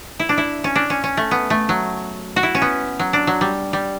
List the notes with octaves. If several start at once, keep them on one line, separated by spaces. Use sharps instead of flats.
E4
D4
E4
C#4
D4
C#4
C#4
A3
B3
A3
F#3
F#4
E4
C#4
B3
F#3
D4
F#3
G3
G3